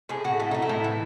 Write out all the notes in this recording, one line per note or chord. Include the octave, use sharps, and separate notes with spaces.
A2 G#4
A2 F#4
A3 E4
A3 D#4
E4
A2
E3